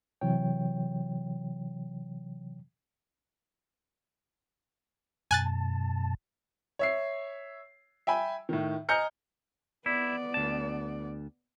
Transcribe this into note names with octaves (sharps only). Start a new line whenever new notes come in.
C3 E3 F#3 C#5 G5
F#2 B2 G#5 A5 F#6 A6
C#5 E5 C7
E5 G5 G#5 B5
A2 D#3
D#5 G#5 A#5 F6 G6 C#7
B3 E4 D5
D2 A5